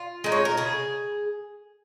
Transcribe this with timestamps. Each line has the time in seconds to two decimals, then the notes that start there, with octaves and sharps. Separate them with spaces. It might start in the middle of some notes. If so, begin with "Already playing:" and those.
Already playing: F4
0.24 G#3 D#4
0.32 C#5
0.45 A#4
0.57 C#3 G#4